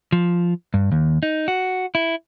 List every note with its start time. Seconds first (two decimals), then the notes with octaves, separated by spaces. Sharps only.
0.12 F3
0.74 G2
0.92 D#2
1.23 D#4
1.48 F#4
1.95 E4